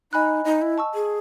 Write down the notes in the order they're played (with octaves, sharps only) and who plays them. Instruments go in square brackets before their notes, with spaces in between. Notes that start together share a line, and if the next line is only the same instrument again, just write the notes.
[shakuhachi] D#4 [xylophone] D#5 G#5 B5 F#6
[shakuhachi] D#4 [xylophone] D#5
[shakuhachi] E4
[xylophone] A5 C#6 E6
[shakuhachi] G#4